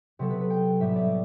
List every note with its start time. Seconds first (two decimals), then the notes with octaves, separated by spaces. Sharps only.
0.19 C3 F#3 B3 A4
0.30 B4
0.41 B4
0.50 G5
0.80 A2 G3 B3 E5
0.96 D5